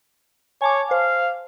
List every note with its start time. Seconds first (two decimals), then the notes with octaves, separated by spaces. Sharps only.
0.61 C#5 G#5 A5 D6
0.91 C5 F5